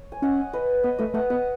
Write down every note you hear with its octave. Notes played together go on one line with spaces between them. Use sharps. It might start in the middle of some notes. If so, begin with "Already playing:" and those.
Already playing: C#5
G#5
C#4 D#5 F#5
B4 D#5
B3 B4 D#5
A3 B4 D#5
A3 D#5 F#5
B3 D#5 F#5